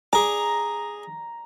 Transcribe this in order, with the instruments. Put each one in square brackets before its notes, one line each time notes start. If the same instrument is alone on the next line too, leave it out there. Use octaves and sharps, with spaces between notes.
[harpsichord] G#4 D6 [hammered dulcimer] A#5